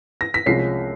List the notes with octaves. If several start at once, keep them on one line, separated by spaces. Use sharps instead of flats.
A#6
B6
C2 C3 F3 G#3 C#4 C7